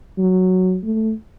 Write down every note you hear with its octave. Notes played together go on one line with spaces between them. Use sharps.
F#3
A3